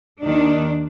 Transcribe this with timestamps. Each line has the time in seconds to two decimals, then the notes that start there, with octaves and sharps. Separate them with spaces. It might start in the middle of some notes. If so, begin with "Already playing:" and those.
0.22 D#2 D#3 D4